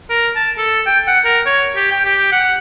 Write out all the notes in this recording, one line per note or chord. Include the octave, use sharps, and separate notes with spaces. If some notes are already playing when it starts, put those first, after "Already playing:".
A#4
A5
A4
G5
F#5
A#4
C#5
G4
G5
G4
F#5